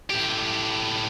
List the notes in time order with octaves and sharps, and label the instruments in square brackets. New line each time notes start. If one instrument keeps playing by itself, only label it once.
[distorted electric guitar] A2 G4